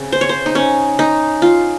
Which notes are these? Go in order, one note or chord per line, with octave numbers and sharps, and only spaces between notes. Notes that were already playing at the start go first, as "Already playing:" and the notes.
Already playing: C#3 C4
C5
C#5
C5
D#4
C#4
D#4
F4